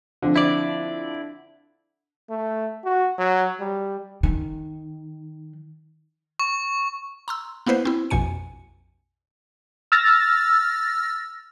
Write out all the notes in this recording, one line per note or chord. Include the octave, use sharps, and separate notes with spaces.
D3 F3 C4
E4 D5
A3
F#4
F#3
G3
D#3
C#6
A#5 C6 E6
A#3 B3 E4 B4 C5
C4 E4
A#1 F2 B2 G#5 C#7
E6 F6 A6 A#6